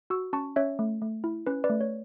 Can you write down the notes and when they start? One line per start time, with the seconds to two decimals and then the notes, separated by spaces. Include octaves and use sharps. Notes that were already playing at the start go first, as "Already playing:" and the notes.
0.10 F#4 C#6 E6
0.33 C#4 A5 C#6
0.56 C#4 C#5 E5
0.79 A3
1.02 A3
1.24 E4
1.47 C#4 B4
1.64 B4 D5
1.70 A3
1.81 C#5